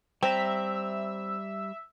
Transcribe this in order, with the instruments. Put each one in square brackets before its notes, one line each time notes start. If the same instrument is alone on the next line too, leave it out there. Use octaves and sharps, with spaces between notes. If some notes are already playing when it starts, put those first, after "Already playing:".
[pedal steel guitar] G3 A#5 [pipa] C4 [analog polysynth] E5